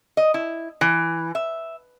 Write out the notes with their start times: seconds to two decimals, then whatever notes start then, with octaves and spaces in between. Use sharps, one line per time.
0.17 D#5
0.34 E4
0.81 E3
1.35 E5